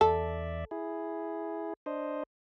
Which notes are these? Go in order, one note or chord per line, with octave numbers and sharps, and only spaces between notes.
E2 A4 D5 E5
E4 G#4
D4 C5 D#5